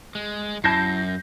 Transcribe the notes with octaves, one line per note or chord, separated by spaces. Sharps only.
G#3
F#2 E4 A5 G6 A#6 C7